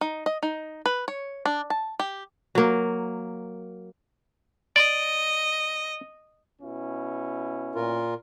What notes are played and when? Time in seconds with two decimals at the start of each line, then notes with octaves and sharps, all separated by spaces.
0.01 D#4
0.26 D#5
0.43 D#4
0.86 B4
1.08 C#5
1.45 D4
1.70 A5
2.00 G4
2.55 F#3 A#3
4.76 D5 D#5
6.62 B2 C#4 E4
7.75 A#2 F4 A#4